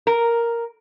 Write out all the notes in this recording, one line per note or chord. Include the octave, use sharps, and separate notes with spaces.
A#4